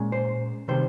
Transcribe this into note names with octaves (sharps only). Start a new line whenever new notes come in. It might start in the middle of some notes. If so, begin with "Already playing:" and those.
Already playing: A#2 G#3 C#4
C5
C3 D#3 G3 C5